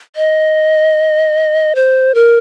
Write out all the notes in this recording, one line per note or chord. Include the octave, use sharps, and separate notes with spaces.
D#5
C5
A#4